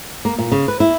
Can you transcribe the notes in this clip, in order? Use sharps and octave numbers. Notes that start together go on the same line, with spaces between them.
A#3
A#2
C#3
B4
E4